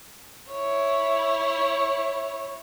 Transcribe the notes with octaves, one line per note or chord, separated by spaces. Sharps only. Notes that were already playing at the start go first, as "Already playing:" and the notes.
E4 C#5